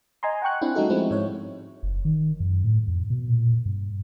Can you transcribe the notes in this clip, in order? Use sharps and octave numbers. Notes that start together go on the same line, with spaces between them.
D#5 G#5 A#5 C6
F#5 G5 C#6 F#6
C4 D4 E4
G3 A3 C#4 D#4 F#4 A4
F3 G#3 C4 E4
G#2 C#5
F#1
D#3
F#2
A2
F2
B2
A#2
G2